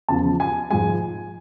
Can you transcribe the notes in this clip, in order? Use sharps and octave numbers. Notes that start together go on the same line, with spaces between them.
E2 C#3 F3 A5
G#5
G#2 F3 G#3 G#5